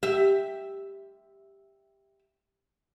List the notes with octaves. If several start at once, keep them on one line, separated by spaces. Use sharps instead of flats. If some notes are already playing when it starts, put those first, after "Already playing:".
G4 E5